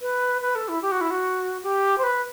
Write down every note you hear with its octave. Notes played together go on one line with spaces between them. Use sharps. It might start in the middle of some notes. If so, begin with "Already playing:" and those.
B4
B4
A4
E4
G4
F#4
E4
F#4
G4
C5
B4